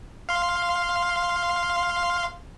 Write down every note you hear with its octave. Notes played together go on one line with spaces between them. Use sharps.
F5 C6